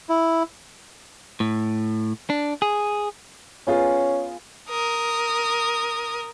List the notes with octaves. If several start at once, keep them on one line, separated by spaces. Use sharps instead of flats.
E4
A2
D4
G#4
B3 C#4 F4 G#4
A#4 D#6